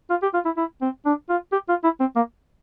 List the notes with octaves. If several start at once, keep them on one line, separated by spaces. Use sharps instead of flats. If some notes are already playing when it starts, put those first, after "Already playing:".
F4
G4
F4
E4
E4
C4
D4
F4
G4
F4
E4
C4
A#3